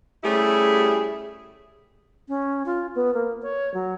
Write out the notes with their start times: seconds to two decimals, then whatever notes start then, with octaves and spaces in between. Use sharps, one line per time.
0.24 G3 A3 C#4 E4 G4 G#4
2.29 C#4
2.66 F4
2.95 B3
3.14 A#3
3.42 C#5
3.74 F#3